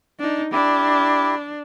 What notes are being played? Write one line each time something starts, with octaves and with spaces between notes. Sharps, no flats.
D4 D#4
D4 E4 G4